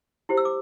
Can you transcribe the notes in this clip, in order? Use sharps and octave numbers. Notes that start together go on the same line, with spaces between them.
E4 G4 C5
E6
D6